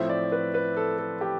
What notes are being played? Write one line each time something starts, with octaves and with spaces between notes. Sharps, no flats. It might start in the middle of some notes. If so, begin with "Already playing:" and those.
Already playing: A2 F3 C4 E5
D5
B4
B4
A4
A4
G4